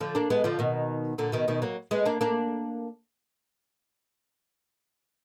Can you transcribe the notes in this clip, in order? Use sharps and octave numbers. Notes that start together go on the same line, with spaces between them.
D3 F3
A#3 D4
G#3 B3
D3 F3
B2 D#3
A#2 D3
B2 D#3
B2 D#3
F#3 A#3
G#3 B3
A#3 D4
A#3 D4